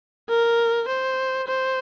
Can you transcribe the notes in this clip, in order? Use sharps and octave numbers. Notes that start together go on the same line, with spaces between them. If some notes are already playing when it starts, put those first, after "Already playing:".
A#4
C5
C5